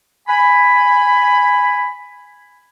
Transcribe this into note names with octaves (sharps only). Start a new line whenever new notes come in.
G#5 B5